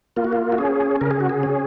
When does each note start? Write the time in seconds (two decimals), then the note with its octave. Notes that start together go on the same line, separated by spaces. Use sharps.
0.16 A#3 F4
0.24 F#4
0.33 F4
0.52 F#4
0.58 C#4 G#4
1.01 C#3 A#4
1.11 G#4
1.20 F#4
1.29 G#4
1.43 C#4